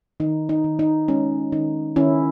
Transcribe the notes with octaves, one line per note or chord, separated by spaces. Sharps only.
D#3 D#4
D#4
D#3
D#4
G#3 C#4
D#3 D#4
D#3 C#4 E4